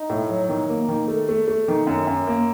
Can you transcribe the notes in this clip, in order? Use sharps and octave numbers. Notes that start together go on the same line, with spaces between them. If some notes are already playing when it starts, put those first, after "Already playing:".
Already playing: D#4
A2
F#3
D#3
A#3
D#3
A3
A3
A3
D#3
F#2
F#2
A#3